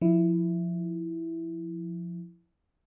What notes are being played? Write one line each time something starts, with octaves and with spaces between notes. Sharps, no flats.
F3 E4